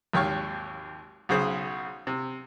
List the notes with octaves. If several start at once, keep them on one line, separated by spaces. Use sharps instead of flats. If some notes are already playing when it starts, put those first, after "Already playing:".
G#1 D#2 G4 C#5 F5 C#6
B1 C#3 C5
C3